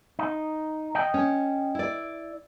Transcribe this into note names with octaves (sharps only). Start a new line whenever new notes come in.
D#4
D#5 G5
C#4
E4 D5